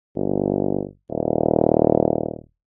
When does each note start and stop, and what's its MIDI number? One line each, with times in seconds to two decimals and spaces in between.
0.15 0.83 31
1.10 2.38 27